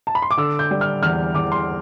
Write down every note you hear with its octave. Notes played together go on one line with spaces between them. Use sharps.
A5
B5
C6
D6
D3 E6
G6
G3
F6
E2 F6
E2 D6
C6